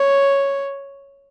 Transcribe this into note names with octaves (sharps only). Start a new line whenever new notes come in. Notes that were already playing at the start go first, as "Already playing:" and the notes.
Already playing: C#5